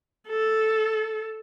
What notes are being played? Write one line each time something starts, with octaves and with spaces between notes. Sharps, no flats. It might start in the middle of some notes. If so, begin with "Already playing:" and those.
A4